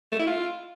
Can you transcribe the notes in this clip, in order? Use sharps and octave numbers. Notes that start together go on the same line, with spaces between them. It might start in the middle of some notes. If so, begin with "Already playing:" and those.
A3
E4
F4